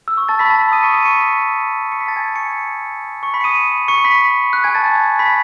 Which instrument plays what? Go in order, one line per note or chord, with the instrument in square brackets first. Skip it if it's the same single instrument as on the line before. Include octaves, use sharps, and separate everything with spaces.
[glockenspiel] E6
C#6
A5 A6
B5 B6
A5 A6
B5 B6
D#6 D#7
C#6 C#7
D#6 D#7
C#6 C#7
B5 B6
C#6 C#7
B5 B6
A5 A6
G#5 G#6
B6
C#6 C#7
C#6 C#7
B5 B6
C#7
D#6 D#7
C#6 C#7
B5 B6
F#6
G#5 G#6
A5 A6
B5 B6